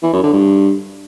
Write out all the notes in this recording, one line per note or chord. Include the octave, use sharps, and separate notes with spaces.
E3
F#2
D3
G2